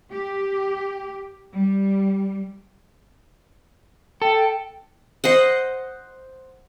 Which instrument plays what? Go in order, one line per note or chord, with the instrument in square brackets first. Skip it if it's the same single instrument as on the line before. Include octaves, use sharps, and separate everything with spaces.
[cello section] G4
G3
[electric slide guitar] A4 [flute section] G5
[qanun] C5 D#5 F#5